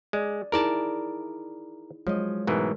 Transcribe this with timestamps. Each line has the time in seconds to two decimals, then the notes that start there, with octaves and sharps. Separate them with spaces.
0.13 G#3 D5
0.52 D#4 E4 G#4 A#4 D5 A5
2.07 F3 F#3 G#3 C#5 D#5
2.47 G#2 B2 E3 A3 A#4